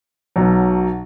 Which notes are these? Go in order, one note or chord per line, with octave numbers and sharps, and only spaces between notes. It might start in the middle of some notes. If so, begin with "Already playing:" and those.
B1 B2 F#3